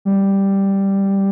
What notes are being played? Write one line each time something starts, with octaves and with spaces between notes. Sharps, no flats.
G3